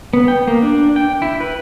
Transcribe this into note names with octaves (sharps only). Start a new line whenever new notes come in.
B3
G5
A#3
D4
G5
E4
B4